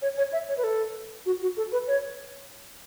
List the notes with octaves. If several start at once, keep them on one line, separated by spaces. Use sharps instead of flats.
C#5
C#5
E5
C#5
B4
A4
F#4
F#4
A4
B4
C#5